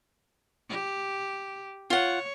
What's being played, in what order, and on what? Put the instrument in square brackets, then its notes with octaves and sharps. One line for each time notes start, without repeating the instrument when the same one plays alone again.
[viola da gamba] G4
[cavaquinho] F4 F#5 [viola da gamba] C#5